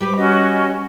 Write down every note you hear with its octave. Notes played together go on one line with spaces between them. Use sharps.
G3 G4 B4 D6
C#4 F#4 D#5